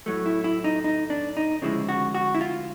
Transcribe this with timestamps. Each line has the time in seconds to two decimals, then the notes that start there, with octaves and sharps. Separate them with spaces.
0.06 A2 F#3 A3
0.26 E4
0.44 E4
0.64 D#4
0.84 D#4
1.10 D4
1.37 D#4
1.62 D2 C#3 F3 G#3 E4
1.89 F#4
2.15 F#4
2.35 E4
2.41 F4